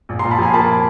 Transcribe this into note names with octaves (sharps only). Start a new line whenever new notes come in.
A#1
A#5 C6
A#2
A5 B5
F3 G#5 A#5
A#3 A5 B5